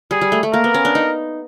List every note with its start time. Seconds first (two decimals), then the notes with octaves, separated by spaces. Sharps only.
0.11 G3 G#4
0.21 G3
0.32 A3
0.43 A3
0.53 A#3 A#4
0.64 B3
0.74 C#4
0.85 D4
0.95 D#4